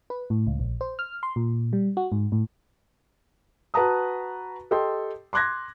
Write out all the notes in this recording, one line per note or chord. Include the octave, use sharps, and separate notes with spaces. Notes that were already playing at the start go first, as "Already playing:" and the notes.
B4
A2
C#2
A#1
C5
F6
C6
A#2
G3
F#4
G#2
A2
F#4 B4 A5 A#5 D#6
G4 A4 D#5 G5 C6
C6 D6 F#6 G#6 A#6